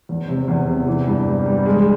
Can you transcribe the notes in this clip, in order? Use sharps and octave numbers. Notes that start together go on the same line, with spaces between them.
E2
C3
E2
C3
E3
G2
G3
G3
G#3